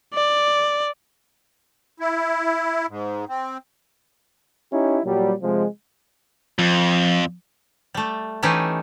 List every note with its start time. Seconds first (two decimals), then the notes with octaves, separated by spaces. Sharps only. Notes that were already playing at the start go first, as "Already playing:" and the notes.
0.14 D5
2.00 E4
2.89 G#2
3.29 C4
4.72 C#4 D#4 E4 G4
5.05 A#2 F#3 G3
5.42 C3 F3 G#3
6.59 F2 F3
7.94 G3 A3
8.43 E3 A3 C#4 D#4 G4